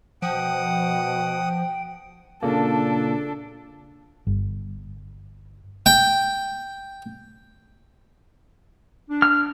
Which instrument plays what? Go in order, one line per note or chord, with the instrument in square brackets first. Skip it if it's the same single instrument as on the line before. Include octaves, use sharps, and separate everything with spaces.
[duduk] B2 [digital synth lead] F3 [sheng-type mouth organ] F#5 D#6 [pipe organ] G5
[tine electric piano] A#2 C#3 A#3 [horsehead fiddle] D4 A4
[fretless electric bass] G1
[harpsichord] G5
[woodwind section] D4
[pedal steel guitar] F6